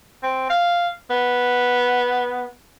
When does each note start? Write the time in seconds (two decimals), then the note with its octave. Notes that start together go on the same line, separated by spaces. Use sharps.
0.23 C4
0.50 F5
1.10 B3